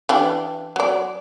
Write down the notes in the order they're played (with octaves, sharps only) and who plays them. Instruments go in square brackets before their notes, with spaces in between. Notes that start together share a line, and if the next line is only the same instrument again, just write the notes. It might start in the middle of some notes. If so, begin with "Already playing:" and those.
[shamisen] E3 D4 G4
F#3 D5